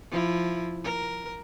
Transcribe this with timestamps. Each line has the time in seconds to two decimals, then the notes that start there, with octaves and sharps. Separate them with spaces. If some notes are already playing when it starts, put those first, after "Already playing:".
0.11 F3 E4
0.84 A#4